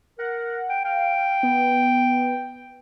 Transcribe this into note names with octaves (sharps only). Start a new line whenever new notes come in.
A#4 F#5
G5
F5 G5
B3